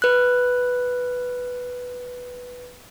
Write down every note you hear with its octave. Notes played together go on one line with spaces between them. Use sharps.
B4 F#6